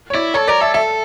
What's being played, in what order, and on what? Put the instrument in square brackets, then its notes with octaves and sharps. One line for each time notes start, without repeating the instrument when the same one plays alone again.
[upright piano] C#5
[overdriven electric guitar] E4 [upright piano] D5
[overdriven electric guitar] A4 [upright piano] C#5
[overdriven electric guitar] A#4 [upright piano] D5
[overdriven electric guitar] A4 [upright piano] E5
[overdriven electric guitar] A4 [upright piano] E5